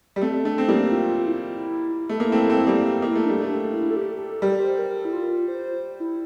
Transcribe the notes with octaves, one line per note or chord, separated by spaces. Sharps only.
G3
A3 C4
A3 D4
C4
G3 A#3 E4
F4
E4
A3
A#3
A3 C4
A3 C4
G3 A#3
A#3 E4
A3
G3 D4
A3
D4
E4
A4
G4
A4
G3 A#4
C5
A#4
A4
E4
F4
C5
E4